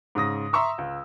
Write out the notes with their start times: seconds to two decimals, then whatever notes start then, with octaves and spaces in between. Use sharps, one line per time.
0.15 G#2 C#3 D#6 A#6
0.53 E5 A#5 C6 C#6 E6
0.78 C#2